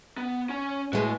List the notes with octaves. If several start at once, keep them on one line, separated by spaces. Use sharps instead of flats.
B3
C#4 G#5
A2 G#3 F#4 B4